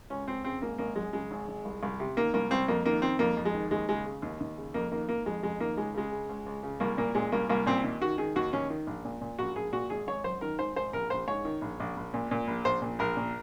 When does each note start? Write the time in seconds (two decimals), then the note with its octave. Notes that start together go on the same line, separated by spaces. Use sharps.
0.10 C#2 C#4
0.27 C#2 C4
0.44 C#3 C4
0.62 G#1 A#3
0.78 G#1 A#3
0.96 F#2 G#3
1.13 C#3 G#3
1.31 G#1
1.48 G#1
1.65 C2
1.83 C2
2.00 C3
2.17 D#3 A#3
2.34 C2 A#3
2.51 C2 C4
2.68 F2 A#3
2.86 D#3 A#3
3.02 D#3 C4
3.19 F2 A#3
3.37 F2
3.45 G#3
3.54 D#3
3.71 D#2 G#3
3.89 C#3 G#3
4.05 C#3
4.22 D#2
4.40 D#2
4.58 C#3
4.74 F2 A#3
4.92 D#3 A#3
5.08 D#3 A#3
5.26 F2 G#3
5.43 F2 G#3
5.60 D#3 A#3
5.77 C#2 G#3
5.94 C#3 G#3
6.12 C#3
6.29 C#2
6.46 C#2
6.63 C#3
6.80 C2 A#3
6.97 A#2 A#3
7.15 A#2 G#3
7.32 C2 A#3
7.49 C2 A#3
7.66 A#2 C4
7.84 D#2
8.01 D#3 F#4
8.18 D#3 G#4
8.36 D#2 F#4
8.53 D#2 C#4
8.70 D#3
8.87 A#1
9.05 A#2
9.21 A#2
9.39 A#1 F#4
9.56 A#1 G#4
9.72 A#2 F#4
9.90 G#1 G#4
10.07 G#1 C#5
10.24 F#2 C5
10.41 D#3 A#4
10.59 G#1 C5
10.76 G#1 C5
10.93 A#1 A#4
11.10 A#1 C5
11.28 G#2 C#5
11.45 D#3
11.61 A#1
11.80 A#1
11.97 A#1
12.14 A#2
12.31 A#2
12.47 A#1
12.65 A#1 C5
12.82 A#2
12.99 A#1 A#4
13.17 A#2